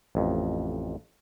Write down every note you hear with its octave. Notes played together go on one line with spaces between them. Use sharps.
A1 F2